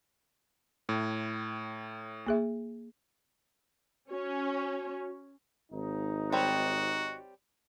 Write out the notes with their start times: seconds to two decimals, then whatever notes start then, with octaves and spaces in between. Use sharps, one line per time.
0.89 A2
2.27 A#3 G#4 E5
4.10 C#4 F#4 C#5
5.72 G#1 D#4
6.32 G3 C4 F#4 C#5